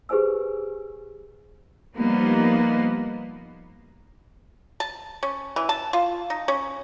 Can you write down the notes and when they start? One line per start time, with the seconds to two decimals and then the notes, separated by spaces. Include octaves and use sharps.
0.09 G4 G#4 B4 C5 G#5 E6
1.97 F3 G3 A#3 B3 D#4
4.80 A5
5.23 C#4
5.56 E3
5.69 A5
5.93 F4
6.30 D#4
6.48 C#4